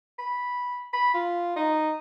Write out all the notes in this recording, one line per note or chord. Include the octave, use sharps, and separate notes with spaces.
B5
B5
F4
D#4